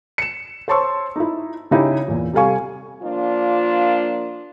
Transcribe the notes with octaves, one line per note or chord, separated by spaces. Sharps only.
C#7 E7
C5 C#5 A5 C6 C#6 E6
D#4 E4
C#3 C#4 D#4 E4 G4
E2 A#2
C3 G3 A4 F5 G#5 C#6
F3 A#3 D4 F4